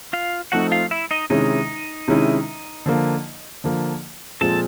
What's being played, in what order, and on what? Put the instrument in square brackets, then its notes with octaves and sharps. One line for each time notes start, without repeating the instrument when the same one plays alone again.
[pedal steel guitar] F4 F5
[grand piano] F3 A3 C4 D#4 [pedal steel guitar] F#4 F#5
[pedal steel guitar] F4 F5
E4 E5
D#4 D#5
[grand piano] C3 D#3 G#3 C#4 E4 [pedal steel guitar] D#4 D#5
[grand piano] C3 D#3 G#3 C#4 E4
D3 F3 A#3
D3 F3 A#3
[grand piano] A#2 F3 G#3 C4 F4 [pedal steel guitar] A4 A5